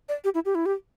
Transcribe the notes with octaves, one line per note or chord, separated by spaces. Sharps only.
D5
G4
E4
G4
E4
G4